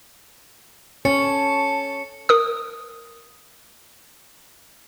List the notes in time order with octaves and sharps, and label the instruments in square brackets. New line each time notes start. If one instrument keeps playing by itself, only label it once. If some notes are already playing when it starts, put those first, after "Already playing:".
[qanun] C#4 [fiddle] A4 A5 [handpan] C#5 [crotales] C#7
[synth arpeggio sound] A#4 D#6